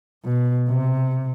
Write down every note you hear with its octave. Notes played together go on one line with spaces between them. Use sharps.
B2
C3